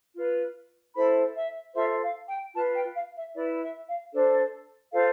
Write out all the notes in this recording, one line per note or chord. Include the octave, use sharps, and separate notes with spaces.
F4 B4
E4 A4 C5 B5
E5
F4 A4 C5 E5
F5
G5
F4 B4 A5
G5
F5
E5
E4 B4 D5
E5
F5
D4 A4 C5
F4 A4 C5 F5